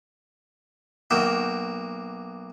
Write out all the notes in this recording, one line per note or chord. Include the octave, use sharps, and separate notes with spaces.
B1 A#3 F#4 E5 G5